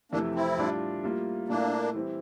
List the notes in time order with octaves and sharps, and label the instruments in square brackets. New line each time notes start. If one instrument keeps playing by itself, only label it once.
[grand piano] F2 C3 E3 A3 E4 [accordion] A#3 D4
[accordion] C4 E4
[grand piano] A2 G3 D4 F4
A2 G3 A#3 F4
[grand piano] A#2 A3 E4 [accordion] A#3 D4
[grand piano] E3 G3 C4 E4